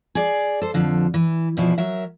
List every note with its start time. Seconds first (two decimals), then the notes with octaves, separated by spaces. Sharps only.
0.15 G#4 D5
0.62 A4 C5
0.74 F2 D3 F3
1.14 E3
1.57 E2 B2 F3 E4
1.78 F#3 A#4 E5